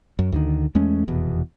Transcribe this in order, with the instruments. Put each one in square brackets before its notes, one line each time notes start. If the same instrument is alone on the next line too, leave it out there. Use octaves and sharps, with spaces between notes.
[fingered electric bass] F#2
D2 D3 D#3
E2 G#3 A3 C#4
F1 E2 B2